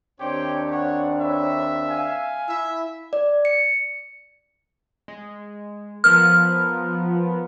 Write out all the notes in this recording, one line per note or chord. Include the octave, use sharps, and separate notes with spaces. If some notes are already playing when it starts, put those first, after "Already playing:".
D#2 C4 D4 G4 C5 C#5 G5
C#5 F#5
B4 C#5 E5
F5 G#5
E4 E5
D5
C#7
G#3
F3 B3 A#4 F6